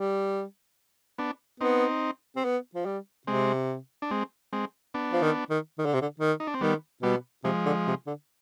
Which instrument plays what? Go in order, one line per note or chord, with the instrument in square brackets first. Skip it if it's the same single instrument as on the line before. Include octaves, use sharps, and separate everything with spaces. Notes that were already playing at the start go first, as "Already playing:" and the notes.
Already playing: [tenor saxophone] G3
[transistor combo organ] B3 D4
[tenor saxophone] B3 [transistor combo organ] C4 D#4
[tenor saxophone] C4
B3
F3
G3
[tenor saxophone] C3 [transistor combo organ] G#3 C4
[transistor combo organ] D4
G#3 C4
G#3 C4
B3 D4
[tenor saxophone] F3
D#3
D#3
D#3
D3
C3
D3
D#3
[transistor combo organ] D#4
D4
C4
[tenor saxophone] D#3 [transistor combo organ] G3 B3
[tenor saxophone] B2 [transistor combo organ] G3 B3
[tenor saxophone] C3 [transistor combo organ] F3 G#3
[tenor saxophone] D3
C3
D3